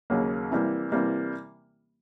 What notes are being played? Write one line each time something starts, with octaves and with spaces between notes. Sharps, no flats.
D#2 C#3 F#3 A#3
C3 E3 G3 A#3
C3 E3 G3 A#3